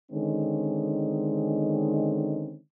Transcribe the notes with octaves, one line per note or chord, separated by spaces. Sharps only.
D3 D#3 G#3 C4 C#4 D#4